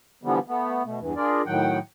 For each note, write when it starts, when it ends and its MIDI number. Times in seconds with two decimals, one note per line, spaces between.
0.23 0.39 50
0.23 0.39 52
0.23 0.39 53
0.23 0.39 55
0.23 0.39 59
0.48 0.83 57
0.48 0.83 59
0.85 0.99 47
0.85 0.99 57
0.99 1.14 40
0.99 1.14 43
0.99 1.14 52
1.16 1.42 62
1.16 1.42 65
1.16 1.42 68
1.16 1.42 70
1.16 1.42 74
1.46 1.79 45
1.46 1.79 51
1.46 1.79 54
1.46 1.79 78
1.46 1.79 79